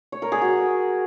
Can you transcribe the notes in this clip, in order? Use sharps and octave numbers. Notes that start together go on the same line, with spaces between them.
C#5
A#4
G#4
F#4